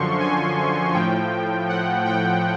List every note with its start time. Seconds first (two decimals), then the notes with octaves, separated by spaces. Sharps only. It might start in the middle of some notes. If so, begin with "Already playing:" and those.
Already playing: F#2 D3 F3 C6 C#6
0.20 G#5
0.94 A2 F3 G5
1.69 F#5
2.05 G5